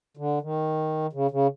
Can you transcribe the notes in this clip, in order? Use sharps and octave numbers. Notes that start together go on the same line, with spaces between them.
D3
D#3
C#3
C#3